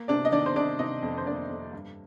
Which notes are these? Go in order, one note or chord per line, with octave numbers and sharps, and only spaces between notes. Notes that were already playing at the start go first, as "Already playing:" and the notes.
Already playing: A#3
C3 D4 D5
D#5
D#3 D4 D5
C5
C3 D4 D5
C3 D#4 D#5
F2
C5
A#3 D4 D5
F2
G2